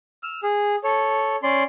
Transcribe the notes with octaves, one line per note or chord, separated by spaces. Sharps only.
E6 F6
G#4
A4 C#5
C#4 D5 C6